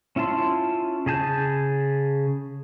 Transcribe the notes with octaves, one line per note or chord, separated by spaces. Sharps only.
C#4 E4 F4 A5 C6
C#3 G#4 A5 G6